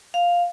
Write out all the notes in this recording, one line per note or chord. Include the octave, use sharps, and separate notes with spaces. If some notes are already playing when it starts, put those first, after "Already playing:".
F5